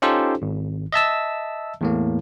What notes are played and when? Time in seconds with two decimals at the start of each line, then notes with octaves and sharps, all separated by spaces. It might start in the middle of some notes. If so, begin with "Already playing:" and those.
0.02 C#4 D#4 F4 G4 A4 C5
0.42 G#1
0.92 D#5 E5 A5 E6
1.81 E2 A2 A#3